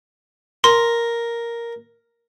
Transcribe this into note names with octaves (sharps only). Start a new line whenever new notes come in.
A#4 C6